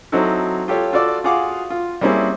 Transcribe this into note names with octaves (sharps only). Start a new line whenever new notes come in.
F#3 C4 D#4 E4 F#4 A4
F4 G4 A4 C#5 F5
F4 F#4 A4 D5 D6 E6
F4 F#4 G#4 F5 F#5 D6
F4
G3 A#3 C4 C#4 E4 G#4